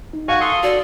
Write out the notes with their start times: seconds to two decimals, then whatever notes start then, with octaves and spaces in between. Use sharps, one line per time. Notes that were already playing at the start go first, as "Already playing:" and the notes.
0.13 D#4
0.28 F#4 F5 G#5 C#6
0.41 A4 C6 D#6
0.63 F#4 A4 D5